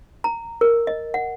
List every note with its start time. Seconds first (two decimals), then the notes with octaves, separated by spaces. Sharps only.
0.24 A#5
0.61 A#4
0.87 D#5
1.14 F#5